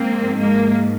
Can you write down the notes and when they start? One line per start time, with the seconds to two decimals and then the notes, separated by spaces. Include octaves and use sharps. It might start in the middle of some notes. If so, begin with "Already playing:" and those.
Already playing: G#2 F3 A#3 C4
0.38 G#3 A#3